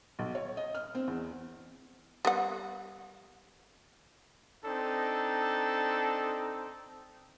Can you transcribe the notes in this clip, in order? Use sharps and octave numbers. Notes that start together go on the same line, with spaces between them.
B1
C#5
D#5
F6
C4
E2
G3 B3 F#5
C4 D4 D#4 A4